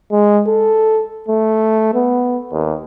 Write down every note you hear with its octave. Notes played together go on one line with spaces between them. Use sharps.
G#3
A4
A3
B3
D#2